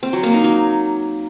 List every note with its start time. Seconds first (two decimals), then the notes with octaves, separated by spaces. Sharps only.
0.03 C4
0.13 F#3
0.23 A#3
0.34 D#4
0.44 F#3